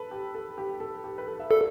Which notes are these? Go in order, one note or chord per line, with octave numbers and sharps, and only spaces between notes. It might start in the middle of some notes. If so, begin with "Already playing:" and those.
Already playing: A4 B4 A5
G4
A4
G4
A4
G4
B4
A4
E5
A4 D5